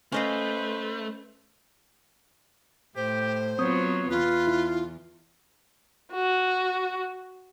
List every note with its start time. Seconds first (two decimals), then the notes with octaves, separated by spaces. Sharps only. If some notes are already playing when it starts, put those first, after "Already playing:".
0.12 A3 C#4 B4 C5 D#5 F5
2.96 A2 G4 C5
3.59 F#3 B3 C4 F4 C#5 D#6
4.10 E2 F4 B4
4.47 E4
6.12 F#4